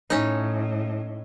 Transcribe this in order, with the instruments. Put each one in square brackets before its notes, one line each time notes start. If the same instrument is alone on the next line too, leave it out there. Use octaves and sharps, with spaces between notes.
[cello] A2 [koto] C#4 D#4